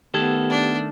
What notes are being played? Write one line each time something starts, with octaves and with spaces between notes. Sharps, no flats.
D#3 A3 B3 G4 A4 G#6
D4